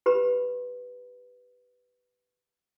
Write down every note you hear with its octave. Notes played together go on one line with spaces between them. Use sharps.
G4 B4 B5